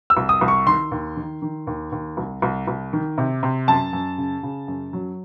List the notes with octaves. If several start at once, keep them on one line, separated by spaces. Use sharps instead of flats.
E6
C2
D#6
C2
C#6
D#3 C6
D#2
D#3
D#3
D#2
D#2
C2
C2
C2
D#3
C3
C3
F#2 A5
F#2
C#3
C#3
F#2
F#3